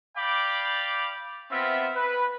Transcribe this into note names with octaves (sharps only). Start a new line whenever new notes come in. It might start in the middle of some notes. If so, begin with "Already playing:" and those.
D5 F5 G5 B5 D6
B3 C4 F4 E5
B4